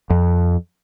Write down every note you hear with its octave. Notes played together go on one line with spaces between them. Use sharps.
F2